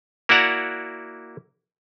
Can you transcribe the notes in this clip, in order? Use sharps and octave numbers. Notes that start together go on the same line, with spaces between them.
A#3 E4 F#4 D5 F#5 A#5